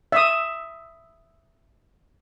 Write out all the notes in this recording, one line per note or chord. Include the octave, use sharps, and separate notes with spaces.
E5 D#6